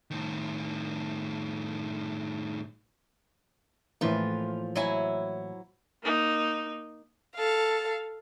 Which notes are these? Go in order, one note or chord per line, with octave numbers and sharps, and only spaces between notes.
A2 D#3
A2 E3 F3 A#3 F4 B4
F#3 E4 G#5
A#3 D#4
A4 F5